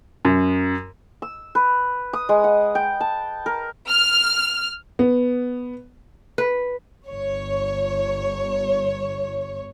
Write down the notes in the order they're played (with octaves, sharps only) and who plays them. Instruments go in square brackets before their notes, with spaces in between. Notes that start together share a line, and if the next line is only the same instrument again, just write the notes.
[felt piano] F#2
[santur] E6
B4
D#6
G#3
F#5
G5
A5
A#4
[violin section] F6
[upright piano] B3
[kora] B4
[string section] G1 C#5